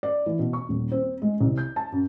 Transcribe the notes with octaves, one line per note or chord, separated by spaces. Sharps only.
D5
E3
B2
C#6
D#1
C4
G#3
C2
G6
A5
F#2